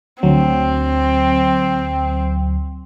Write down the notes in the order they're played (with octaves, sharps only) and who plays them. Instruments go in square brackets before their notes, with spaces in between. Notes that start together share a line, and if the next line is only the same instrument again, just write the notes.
[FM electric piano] D2 F#3 [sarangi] C4